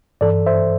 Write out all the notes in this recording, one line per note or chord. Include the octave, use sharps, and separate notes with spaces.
G2 E3 A4 D5
C5 E5